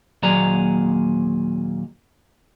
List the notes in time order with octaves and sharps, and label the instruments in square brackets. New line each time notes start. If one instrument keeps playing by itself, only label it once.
[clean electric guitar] D#2 A#2 F#3 G#4 D5 A#5